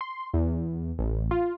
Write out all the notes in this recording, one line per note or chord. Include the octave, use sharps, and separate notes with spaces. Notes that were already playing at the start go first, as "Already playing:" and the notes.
C6
E2
A1
F4